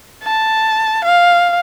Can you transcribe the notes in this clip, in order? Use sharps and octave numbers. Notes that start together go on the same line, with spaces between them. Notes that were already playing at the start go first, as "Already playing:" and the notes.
A5
F5